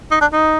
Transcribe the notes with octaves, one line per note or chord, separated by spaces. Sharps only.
D#4
D4
D#4